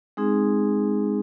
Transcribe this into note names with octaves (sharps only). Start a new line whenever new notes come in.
G#3 C4 D#4 G#4